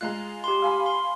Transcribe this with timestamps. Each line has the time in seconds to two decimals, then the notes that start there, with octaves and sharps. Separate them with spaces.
0.01 G#3 F4 A#5 F#6
0.44 G4 C6
0.62 F5 G#5 B5
0.86 C6